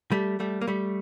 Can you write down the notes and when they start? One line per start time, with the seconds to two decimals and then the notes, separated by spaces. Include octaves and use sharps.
0.11 G3 A3
0.40 G3 A3
0.61 A#3
0.67 G3 A3